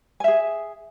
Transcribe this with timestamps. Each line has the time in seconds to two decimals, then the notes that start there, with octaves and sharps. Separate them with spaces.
0.20 G#5
0.24 E5
0.28 G#4